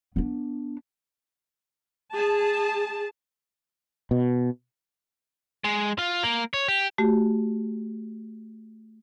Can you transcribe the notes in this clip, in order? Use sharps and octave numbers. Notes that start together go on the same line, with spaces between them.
B3 D4
G#4 A5
B2
G#3
F4
A#3
C#5
G4
A3 F#4 G4